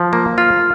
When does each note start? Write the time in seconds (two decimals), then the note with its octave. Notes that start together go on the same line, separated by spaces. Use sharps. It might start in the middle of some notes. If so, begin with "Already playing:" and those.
Already playing: F3
0.13 A#3
0.38 F4 F6